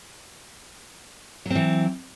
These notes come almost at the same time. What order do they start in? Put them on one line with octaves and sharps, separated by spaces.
F#3 C4 E3